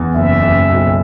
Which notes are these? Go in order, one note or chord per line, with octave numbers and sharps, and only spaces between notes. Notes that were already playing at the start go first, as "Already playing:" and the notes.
Already playing: E2
F#1 E5
F#1
B1